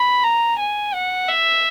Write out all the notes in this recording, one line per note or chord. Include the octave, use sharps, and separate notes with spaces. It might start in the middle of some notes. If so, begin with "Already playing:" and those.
Already playing: B5
A#5
G#5
F#5
E5